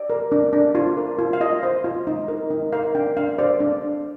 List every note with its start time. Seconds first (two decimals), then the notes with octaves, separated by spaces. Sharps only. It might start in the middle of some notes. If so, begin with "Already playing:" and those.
Already playing: D5
0.10 A#4
0.32 D4
0.53 D4
0.75 F4
0.97 A#4
1.19 F4
1.33 F5
1.41 F4 D#5
1.63 C5
1.84 F4
2.07 D#4
2.28 A#4
2.51 D#4
2.72 A#4 F5
2.95 D4 G5
3.17 D4 F5
3.39 C5 D5
3.60 D4